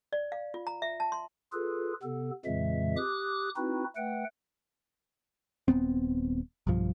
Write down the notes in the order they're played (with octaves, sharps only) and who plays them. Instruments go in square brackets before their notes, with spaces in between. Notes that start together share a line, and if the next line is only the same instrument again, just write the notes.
[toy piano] D5
F5
F4
A#5
E5
A5
C6
[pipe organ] F4 G#4 A4 B4
C3 B3 A4
F2 A#2 C#3 E3 G#3 E5
G4 D6 D#6 F#6
C4 D#4 E4 F#4 B4
A3 B4 F#5 G5
[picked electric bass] D#1 A2 B3 C4
B1 G2 F3